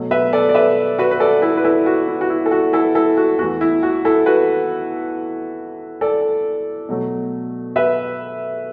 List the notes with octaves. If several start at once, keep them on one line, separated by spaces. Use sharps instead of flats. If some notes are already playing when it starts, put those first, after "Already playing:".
Already playing: B2 F#3 A3
B4 E5
A4 D5
D5
B4 E5
F#4 B4
B4
A4 D5
E4 A4
B4
E4 A4
F#4
E4
F#4
E4
A4
F#4
E4 A4
E4 A4
F#4
E2 E3 A3 F#4
E4
F#4
E4 A4
F#4 B4
A4 D5
B2 F#3 A3
B4 E5